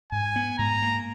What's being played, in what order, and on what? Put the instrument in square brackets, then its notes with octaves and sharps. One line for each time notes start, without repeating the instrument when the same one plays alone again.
[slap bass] G#2 [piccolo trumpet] G#5
[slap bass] B3
[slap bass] G#2 [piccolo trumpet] A#5
[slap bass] A#3